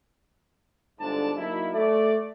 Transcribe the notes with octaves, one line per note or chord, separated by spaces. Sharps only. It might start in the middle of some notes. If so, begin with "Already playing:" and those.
G1 G#2 D3 D4 D5 A5
F#3 A#3 D#4 E4
A3 D5